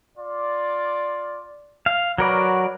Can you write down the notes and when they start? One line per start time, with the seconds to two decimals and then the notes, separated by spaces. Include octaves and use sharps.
0.18 F4 D5
1.86 F5
2.18 F#3 F#4 A#4 B4 D5 B5